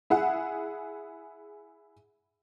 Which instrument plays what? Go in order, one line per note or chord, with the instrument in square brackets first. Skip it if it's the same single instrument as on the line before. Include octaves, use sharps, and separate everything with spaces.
[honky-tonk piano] E4 G#4 F#5